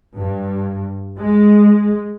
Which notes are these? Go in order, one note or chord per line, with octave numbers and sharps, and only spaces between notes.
G2
G#3